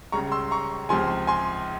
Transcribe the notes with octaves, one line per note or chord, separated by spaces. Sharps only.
C#2 C#3 G3 A#5 C#6
C6 E6
A#5 C#6
C#2 C3 F3 G#5 C6
G#5 C6